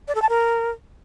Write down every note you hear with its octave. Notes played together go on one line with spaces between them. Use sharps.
D5
A4
A5
A#4